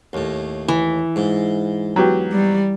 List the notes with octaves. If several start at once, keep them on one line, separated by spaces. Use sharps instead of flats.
D#2 A2
E3
G#2
F#3 B3 G4
G3